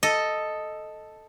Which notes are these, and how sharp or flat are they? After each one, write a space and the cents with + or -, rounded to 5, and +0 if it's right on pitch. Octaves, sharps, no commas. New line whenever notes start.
A4 +0 D#5 +0